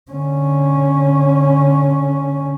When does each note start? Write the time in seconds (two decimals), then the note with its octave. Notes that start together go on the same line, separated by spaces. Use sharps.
0.11 D3 C#4